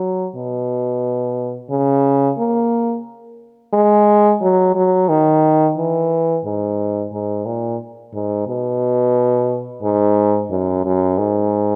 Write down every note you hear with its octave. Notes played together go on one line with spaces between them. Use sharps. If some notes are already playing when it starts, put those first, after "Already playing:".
Already playing: F#3
B2
C#3
A#3
G#3
F#3
F#3
D#3
E3
G#2
G#2
A#2
G#2
B2
G#2
F#2
F#2
G#2